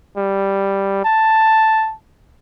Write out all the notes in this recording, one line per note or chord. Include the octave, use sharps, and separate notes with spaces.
G3
A5